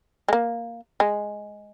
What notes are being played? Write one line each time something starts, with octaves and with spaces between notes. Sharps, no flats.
G#3
A#3
G#3